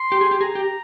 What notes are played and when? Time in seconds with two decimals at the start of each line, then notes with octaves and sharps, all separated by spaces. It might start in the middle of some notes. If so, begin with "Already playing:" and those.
Already playing: C6
0.12 G4
0.21 G#4
0.31 G4
0.40 G#4 A#5
0.55 G4